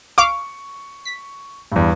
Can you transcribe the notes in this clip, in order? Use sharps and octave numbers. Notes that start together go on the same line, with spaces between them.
F5 C#6 D6
B6
E2 G2